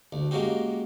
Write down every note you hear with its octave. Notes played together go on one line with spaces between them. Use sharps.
D2
G#3 A#3 C#4 F#4 G4